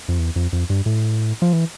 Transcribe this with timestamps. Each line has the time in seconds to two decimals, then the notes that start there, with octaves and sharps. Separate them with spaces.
0.08 F2
0.19 E2
0.36 F2
0.53 F2
0.70 G2
0.86 A2
1.42 F3
1.53 E3